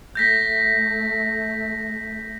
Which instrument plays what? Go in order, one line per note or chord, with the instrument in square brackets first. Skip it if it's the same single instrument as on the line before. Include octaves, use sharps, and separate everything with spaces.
[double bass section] A3 [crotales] G6 A#6 B6